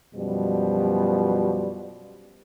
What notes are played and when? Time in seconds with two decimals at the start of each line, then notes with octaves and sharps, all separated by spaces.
0.15 F#2 B2 F3 G3